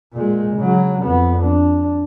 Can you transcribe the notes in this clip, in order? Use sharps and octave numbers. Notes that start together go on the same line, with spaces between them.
A#2 G#3
C#3 F#3
F2 B3
D4